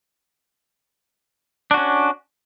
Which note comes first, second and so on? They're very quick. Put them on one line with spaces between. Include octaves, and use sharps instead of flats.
D4 F#4 C#4